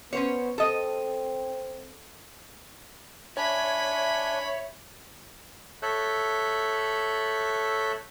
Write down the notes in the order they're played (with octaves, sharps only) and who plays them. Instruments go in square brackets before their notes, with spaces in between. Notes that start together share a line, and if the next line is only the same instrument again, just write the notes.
[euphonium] B3 [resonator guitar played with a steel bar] C#4 C5 C#5
[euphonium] C4 [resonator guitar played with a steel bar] A4 D#5
[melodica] D4 G#5 [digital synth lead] C#5 [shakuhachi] E5 [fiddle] B5
[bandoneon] A4 C#5 E5 E6 F#6 G6